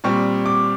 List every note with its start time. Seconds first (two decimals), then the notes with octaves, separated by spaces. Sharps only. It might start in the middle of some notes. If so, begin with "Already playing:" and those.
0.04 A#2 G3 C4 C#6
0.46 D6